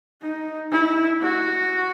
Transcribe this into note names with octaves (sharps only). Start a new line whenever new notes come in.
D#4
E4
F#4